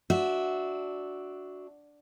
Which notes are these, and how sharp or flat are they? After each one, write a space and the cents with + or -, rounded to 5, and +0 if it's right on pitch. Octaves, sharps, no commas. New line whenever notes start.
D4 +0 F#4 +0 E5 -15